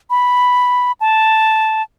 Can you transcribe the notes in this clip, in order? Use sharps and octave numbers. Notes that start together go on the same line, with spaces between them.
B5
A5